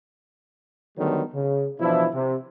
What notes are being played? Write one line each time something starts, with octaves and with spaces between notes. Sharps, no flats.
D3 D#3 F#3 G3 A3 B3
C#3
B2 E3 F3 D4 E4
C3